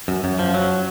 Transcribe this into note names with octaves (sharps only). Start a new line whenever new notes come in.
F#2
F#2
F3
F#3